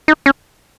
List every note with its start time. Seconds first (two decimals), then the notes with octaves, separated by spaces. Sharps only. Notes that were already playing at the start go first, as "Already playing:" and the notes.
0.08 D#4
0.26 C#4